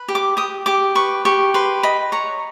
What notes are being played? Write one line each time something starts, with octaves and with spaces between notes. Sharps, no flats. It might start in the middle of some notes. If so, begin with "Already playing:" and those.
Already playing: B4
G4
D6
G4 D#6
G4 D6
B4 C#6
G4 C#6
B4 C6
D#5 B5
C#5 A#5